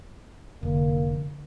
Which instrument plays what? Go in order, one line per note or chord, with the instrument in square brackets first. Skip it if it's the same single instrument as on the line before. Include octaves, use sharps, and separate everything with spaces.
[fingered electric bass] F1 [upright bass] D3 [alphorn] A#3